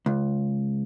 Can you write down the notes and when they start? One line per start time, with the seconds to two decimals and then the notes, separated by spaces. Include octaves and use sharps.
0.06 C#2